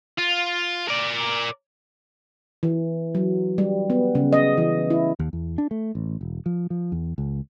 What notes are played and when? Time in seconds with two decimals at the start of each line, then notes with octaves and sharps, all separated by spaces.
0.18 F4
0.89 A#4 D5
2.63 E3
3.15 F#3
3.58 G3
3.90 B3
4.15 C#3
4.33 D#5
4.57 E3
4.90 E4
5.19 D#2
5.33 E2
5.58 D4
5.71 A3
5.95 A1
6.21 E1
6.46 F3
6.70 F3
6.92 E2
7.18 C#2